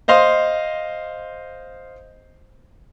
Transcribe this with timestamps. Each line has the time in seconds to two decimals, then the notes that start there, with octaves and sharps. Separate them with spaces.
0.08 C5 D#5 F5 C6